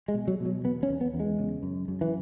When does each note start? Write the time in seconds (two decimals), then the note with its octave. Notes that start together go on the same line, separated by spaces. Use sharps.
0.08 G#3
0.14 B2
0.28 F#3
0.40 B2
0.46 F#3
0.64 E2 B3
0.83 C#4
0.89 E2
1.01 B3
1.14 E2
1.20 G#3
1.39 C#3
1.63 F#2
1.88 F#2
2.01 E3